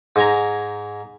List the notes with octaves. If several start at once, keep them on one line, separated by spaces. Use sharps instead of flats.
G#2 G#5 A#5